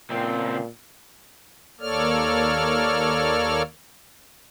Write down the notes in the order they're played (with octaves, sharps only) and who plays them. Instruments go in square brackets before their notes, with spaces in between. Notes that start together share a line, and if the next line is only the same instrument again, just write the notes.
[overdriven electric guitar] C#2 C4 [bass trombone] A#2
[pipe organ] D#2 A#3 A4 C#5 D5 F6